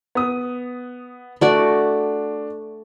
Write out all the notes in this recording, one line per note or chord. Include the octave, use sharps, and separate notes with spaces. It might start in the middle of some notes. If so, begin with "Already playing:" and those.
B3 D#6
A3 D4 F#4 D5